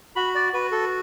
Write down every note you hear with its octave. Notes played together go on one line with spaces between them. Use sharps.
F#4 B5
D5
F#4 B4
A4